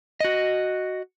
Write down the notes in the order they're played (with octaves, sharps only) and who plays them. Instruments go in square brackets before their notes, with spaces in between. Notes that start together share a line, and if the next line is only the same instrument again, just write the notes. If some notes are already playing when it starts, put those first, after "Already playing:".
[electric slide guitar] F#4 D#5